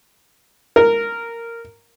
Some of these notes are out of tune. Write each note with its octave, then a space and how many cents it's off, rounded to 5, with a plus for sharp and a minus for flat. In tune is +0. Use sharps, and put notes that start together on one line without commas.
A#4 -10